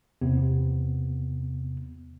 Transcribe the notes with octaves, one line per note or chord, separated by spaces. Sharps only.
E2 C3 B3